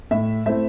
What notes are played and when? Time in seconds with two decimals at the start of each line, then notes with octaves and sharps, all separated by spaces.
0.11 A2 E5
0.46 A3 C4 E4 E5